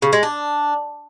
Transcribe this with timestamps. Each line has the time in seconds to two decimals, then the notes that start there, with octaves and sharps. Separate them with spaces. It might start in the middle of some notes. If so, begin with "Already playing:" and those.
0.02 C#3
0.13 G#3
0.23 D4